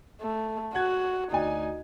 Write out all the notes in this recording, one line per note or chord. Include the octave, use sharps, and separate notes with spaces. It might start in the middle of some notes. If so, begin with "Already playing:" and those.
A3
F#4 F#5 F#6 G#6
D2 D#4 D5 G#5